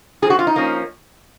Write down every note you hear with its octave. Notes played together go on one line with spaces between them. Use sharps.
F3 C4 F#4 G#4
F4
D#4
F3 A#3 C#4